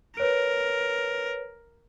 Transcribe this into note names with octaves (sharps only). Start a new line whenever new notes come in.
A#4 B4 C#5 D7